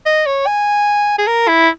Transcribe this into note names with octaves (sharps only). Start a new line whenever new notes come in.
D#5
C#5
G#5
G#4
A#4
E4